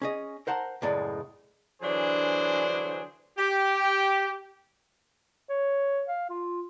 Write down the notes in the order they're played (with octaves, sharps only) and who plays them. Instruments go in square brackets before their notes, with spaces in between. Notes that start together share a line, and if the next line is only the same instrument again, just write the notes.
[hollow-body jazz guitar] C#4 G#4 D#5
A#4 C5 F#5 A5 A#5
C#2 F#2 A2 G#3 D5
[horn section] D3 E3 F#3 D4 G#4 C5
G4
[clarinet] C#5
F5
F4